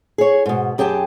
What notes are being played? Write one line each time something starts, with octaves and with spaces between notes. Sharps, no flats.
G#4 C#5
G#2 B2
F#2 G4 G#4 G5 A5